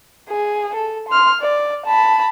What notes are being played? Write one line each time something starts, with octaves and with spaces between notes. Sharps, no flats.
G#4
A4
C6 F6
D5
A5 B5